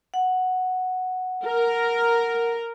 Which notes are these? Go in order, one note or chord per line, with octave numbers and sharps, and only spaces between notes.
F#5
A#4